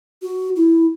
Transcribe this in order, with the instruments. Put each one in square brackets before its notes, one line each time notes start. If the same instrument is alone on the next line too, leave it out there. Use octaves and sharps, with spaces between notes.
[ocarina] F#4
E4